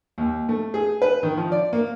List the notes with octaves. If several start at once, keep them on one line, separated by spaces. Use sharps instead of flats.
D#2
A3
G#4
B4
D#3
F3
D5
A#3